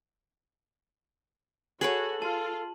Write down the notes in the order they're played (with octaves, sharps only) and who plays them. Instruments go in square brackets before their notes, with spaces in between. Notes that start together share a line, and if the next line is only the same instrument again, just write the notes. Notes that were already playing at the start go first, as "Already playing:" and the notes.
[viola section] F#4 [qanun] G#4 B4 C#5 [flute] A4 [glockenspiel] F#7
[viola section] F4 [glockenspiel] A5